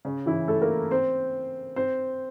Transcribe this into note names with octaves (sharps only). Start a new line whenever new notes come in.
C#3 C#4
E3 E4
A3 A4
A#3 A#4
C4 C5
C4 C5